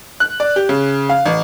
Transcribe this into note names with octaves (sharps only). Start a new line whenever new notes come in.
F#6
D5
G4
C#3
F5
A1